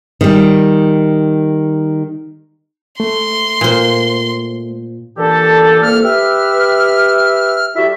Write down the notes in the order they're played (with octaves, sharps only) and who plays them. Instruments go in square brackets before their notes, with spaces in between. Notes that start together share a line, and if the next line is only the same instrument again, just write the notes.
[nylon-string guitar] D#3 G3
[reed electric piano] A3 [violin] C6
[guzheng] A#2 C5
[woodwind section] A#2 D3 E3 D4 G4 A4
C2 A#2 A#3 A4 F6
G4 B4 E5 F6
G3 E4 F#4 G4 A4 E5